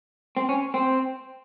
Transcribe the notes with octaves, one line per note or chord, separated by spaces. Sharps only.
C4
C#4
C4